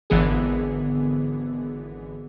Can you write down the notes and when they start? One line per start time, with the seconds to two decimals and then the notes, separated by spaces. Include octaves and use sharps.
0.10 G#1 D3 E3 B3 G#4